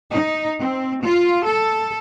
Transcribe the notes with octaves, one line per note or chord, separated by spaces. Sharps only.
D#4
C4
F4
A4